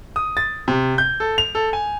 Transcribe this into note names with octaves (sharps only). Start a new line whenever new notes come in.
D#6
A6
C3
G6
A4
F7
A4
G#5